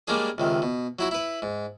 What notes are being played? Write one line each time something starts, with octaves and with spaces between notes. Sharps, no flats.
G3 G#3 A#3 C#4 D4 G#4
C#2 C3 D#3
B2
F#3 E4 F#4
E4 B4
G#2